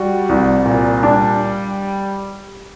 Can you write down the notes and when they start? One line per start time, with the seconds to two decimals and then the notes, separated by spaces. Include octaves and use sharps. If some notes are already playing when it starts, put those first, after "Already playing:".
Already playing: G3 F#4
0.29 C2
0.65 A#2
1.03 G3 D4